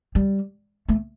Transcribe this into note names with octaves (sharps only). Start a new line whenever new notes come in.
G3
A3